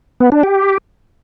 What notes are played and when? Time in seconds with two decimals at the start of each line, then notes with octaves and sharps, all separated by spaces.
0.20 B3
0.32 D4
0.43 G4